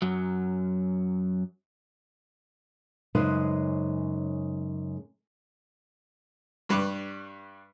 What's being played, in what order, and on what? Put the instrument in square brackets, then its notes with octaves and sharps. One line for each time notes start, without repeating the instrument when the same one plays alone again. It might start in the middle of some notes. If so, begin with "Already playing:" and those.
[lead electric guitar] F#2 F#3
[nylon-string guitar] F#2 C#3 G#3 D#4 B4 C5
[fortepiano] G2 G3 B4 C#6 D6